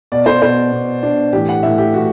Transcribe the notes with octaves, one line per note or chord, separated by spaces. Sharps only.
B2 D5
C5
B2 C5
B2
B2 D4
A2 E3 G4
F#5
A2 E3 E5
G4
A2 E3 F#4